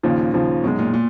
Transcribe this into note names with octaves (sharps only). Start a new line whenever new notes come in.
D#2 A#2 C#3 F3
D#2 C#3 F3
F#2 B2 D#3 G#3
A#2
A#2